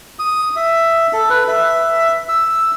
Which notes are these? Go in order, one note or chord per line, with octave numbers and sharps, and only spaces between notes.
D#6
E5
A4
B4
E5
E6